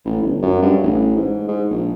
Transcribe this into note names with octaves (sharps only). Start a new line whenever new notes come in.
A1
G1
F#2
G2
A1
G#2
G#2
A#1